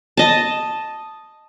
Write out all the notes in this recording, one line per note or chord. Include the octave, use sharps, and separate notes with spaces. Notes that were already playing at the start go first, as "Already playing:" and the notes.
D#5 A5